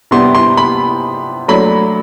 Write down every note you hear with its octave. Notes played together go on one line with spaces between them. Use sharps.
C3 G3 B3 D4 C6
C6
B5
F#3 A3 D4 B5